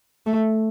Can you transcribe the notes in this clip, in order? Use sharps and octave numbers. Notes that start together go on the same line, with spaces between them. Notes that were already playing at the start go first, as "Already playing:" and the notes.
A3